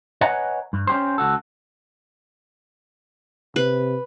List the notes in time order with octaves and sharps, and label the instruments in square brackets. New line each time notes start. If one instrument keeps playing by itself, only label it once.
[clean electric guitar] B4 C#5 D#5 F#5 G#5 A#5
G2
C#4 G4 C5
C#2 F#4 A4
[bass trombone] C3 [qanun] B4